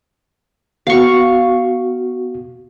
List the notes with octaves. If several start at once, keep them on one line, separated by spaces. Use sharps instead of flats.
B3 F#4 F5 C#6